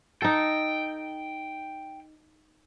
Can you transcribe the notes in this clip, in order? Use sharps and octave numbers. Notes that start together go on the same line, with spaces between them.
D#4 A4 G5